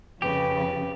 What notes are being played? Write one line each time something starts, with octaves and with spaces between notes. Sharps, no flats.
F2 C#3 G4 B4